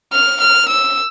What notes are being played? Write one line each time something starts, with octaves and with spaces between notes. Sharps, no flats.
F6
F6
E6